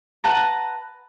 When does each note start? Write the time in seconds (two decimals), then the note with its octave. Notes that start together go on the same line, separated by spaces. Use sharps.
0.24 B4 F#5 A5 A#5